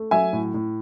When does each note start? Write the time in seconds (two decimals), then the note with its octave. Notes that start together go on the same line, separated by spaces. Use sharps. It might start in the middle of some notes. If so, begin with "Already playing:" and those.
Already playing: A3
0.11 F#3 E5 G#5
0.33 A2
0.54 A2